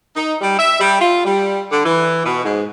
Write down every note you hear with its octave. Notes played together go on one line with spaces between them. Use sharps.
D#4
G3
E5
G3
F4
G3
D3
E3
B2
G#2